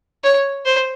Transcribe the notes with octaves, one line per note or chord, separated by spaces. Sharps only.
C#5
C5